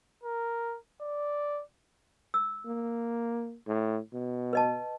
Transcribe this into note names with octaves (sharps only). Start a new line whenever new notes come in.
A#4
D5
E6
A#3
A2
B2
B4 D#5 A5